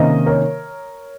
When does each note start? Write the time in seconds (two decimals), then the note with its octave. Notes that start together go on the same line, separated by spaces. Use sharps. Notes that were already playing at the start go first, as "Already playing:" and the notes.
Already playing: C3 D#3 A#3 C#4 C5 D#5
0.26 A#4 C#5